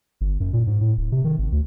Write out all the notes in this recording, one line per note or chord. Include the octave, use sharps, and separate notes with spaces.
G1
F#2
A#2
G#2
A2
D1
C3
D#3
G#1
D2